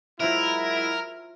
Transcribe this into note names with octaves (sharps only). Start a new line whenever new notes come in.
F#3 G#3 E4 F4 A#4 C5 E5